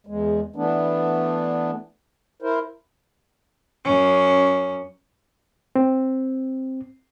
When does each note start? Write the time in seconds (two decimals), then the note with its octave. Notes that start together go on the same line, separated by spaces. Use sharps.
0.07 E2 G#3
0.56 E3 A3 B3 D4
2.42 E4 A#4 C5
3.84 F#2 C#4
5.76 C4